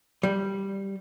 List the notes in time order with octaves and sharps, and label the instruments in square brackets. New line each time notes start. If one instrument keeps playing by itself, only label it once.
[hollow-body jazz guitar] G3